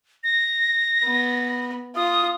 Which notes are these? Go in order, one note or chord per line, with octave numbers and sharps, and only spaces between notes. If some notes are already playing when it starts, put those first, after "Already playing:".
A#6
B3
F4 D#6